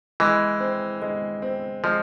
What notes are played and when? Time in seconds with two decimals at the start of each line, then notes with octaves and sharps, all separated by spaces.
0.20 E3 G#3
0.60 C4
1.02 G#3
1.42 C4
1.84 F3 G#3